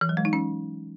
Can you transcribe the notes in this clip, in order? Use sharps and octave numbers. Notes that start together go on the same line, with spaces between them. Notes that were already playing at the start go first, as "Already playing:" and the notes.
E3
F#3
G#3
D#4
C#4